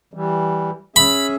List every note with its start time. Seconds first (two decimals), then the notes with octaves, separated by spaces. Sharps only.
0.14 E3 G3
0.96 C#4 G#4 E5 B5